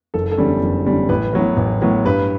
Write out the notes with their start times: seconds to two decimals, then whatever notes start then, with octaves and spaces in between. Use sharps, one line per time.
0.14 F#1 A4
0.31 A4
0.37 E2 D3 G3 C#4
0.63 F#1
0.86 E2 D3 G3 C#4
1.09 A1 B4
1.33 A2 F#3 B3
1.57 A1
1.82 A2 F#3 B3
2.05 G2 B4